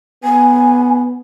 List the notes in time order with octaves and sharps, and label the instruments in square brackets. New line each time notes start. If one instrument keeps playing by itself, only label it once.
[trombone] B3 [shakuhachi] G#5